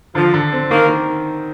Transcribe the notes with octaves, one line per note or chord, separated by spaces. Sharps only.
D3 F3
D3
C4
D#3 A#3
D#3